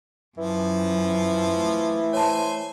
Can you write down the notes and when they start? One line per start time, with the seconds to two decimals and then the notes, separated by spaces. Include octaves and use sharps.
0.38 F#2 E3 F3
1.53 A3
2.13 C5 C#5 G#5 A5